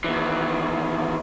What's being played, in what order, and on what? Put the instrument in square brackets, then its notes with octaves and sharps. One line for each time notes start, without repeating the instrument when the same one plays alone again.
[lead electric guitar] D#2 E3